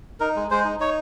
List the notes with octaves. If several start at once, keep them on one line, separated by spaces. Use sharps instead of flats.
D#4 A#4
G#3
G#3 C5
D#4
D#4 C#5